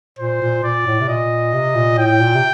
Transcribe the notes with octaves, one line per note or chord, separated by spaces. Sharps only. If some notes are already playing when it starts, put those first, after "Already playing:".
A#2 C5
A#2
A#2 D5
A2
C3
A#2 D#5
C3
A#2
A2 G5
A#2
C3